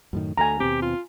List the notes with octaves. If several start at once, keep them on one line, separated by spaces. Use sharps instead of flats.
F#2 A2 D#3
D2 A3 G#5 A#5
D#2 B2 C4 G4
F4